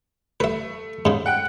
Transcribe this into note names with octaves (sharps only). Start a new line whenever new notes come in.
A3 B4 E5
G#2 C#3
F#5 G5 F#6